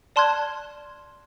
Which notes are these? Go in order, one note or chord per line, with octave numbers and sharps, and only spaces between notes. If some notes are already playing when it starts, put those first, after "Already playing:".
D5 A5 C6 F6 F#6 G#6